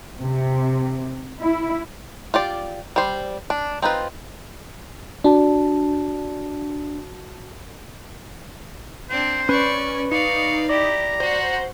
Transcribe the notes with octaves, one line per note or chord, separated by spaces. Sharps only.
C3
E4
F4 G4 D5
G3 C5
D4
C4 D#4 F4 B4
D4 F#4 A5
C4 D4 C5
C#4 B4 D5 C#6
D#4 D5 F5 C#6
E4 G4 D5 A#5
F#4 C5 F#5